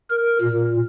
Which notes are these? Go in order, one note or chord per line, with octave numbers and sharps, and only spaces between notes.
A#4
A#2